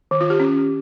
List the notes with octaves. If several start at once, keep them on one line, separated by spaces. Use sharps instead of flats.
D#3
F4
G4
C#4